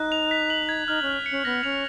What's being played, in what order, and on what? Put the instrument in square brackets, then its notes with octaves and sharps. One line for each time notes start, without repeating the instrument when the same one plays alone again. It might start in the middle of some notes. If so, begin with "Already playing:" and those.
Already playing: [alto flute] D#4 [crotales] F#6
[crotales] F7
B6
F#7
G#6
[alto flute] D#4 [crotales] F6
[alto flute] C#4 [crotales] F6
[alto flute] C#4 [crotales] C#7
[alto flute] B3 [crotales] A#6
[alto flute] C#4 [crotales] F7